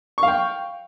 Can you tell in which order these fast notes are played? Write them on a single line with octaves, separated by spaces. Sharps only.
C#6 F5 G5